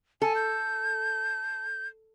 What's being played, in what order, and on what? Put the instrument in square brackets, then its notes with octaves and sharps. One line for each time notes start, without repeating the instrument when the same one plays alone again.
[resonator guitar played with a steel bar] A4 [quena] G#5
[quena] G6